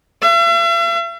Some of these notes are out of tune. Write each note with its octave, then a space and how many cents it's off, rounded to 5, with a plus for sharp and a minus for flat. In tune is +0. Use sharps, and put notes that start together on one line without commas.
E5 +45